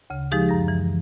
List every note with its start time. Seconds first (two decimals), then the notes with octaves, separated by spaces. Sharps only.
0.10 D2 C#3
0.31 F3 G#3 D#4 G4 G#4
0.49 F#2 A#6
0.68 E3